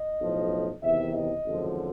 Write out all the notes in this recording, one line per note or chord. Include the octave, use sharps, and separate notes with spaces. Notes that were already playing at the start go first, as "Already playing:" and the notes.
Already playing: D#5
B1 A2 F3
E2 C3 D#3 E5
D#5
G#1 F#2 D3 F3